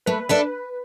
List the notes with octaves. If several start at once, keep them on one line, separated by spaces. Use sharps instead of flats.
A3 B4
D4 A4 B4 E5